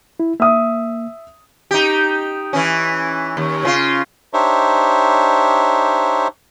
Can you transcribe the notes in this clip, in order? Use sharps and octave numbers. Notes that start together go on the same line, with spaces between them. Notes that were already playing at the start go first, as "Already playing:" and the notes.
E4
A#3 E5 D#6
D#4 G4
E3 C#4
D#2
C#3 C4 F4
D4 D#4 G4 C5 C#5 E5